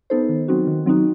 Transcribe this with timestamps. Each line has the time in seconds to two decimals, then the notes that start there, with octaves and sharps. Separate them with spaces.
0.10 B3 D#4 A4 C5
0.29 D#3
0.48 F#3 C4 D#4 F#4
0.67 D#3
0.86 F#3 C4 D#4 F#4